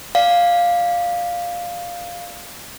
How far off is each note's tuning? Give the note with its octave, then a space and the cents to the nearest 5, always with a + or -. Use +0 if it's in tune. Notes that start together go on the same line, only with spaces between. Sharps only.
D5 +5 F5 +0